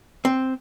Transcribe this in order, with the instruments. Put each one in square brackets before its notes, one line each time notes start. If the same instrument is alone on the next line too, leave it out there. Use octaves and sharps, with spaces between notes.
[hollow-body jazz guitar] C4